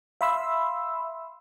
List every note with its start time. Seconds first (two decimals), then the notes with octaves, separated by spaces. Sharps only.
0.21 E5 F5 B5 C6 E6